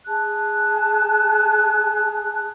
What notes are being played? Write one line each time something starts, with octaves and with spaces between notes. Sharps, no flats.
G#4 A5 F#6